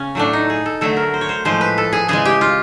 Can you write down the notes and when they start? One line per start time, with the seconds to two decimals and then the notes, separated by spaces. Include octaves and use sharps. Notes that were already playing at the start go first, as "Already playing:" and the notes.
Already playing: C#3 C#4
0.15 A2 F#3 A3 D4
0.33 D#4
0.50 G#4
0.66 A4
0.81 D3 F#3 A3 A4
0.97 A#4
1.14 C5
1.21 C#5
1.29 C5
1.45 A2 F3 G#3 C5
1.61 B4
1.78 A4
1.93 G#4
2.08 C#3 E3 G#3 G#4
2.25 G4
2.41 F4